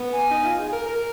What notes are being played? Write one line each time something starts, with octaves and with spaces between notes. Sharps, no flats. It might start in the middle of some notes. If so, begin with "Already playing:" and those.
Already playing: B3
G#5
D#4
F4
G#4
A#4
A#4